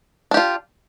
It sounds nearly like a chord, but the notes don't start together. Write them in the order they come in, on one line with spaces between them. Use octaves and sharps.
D4 G4 F4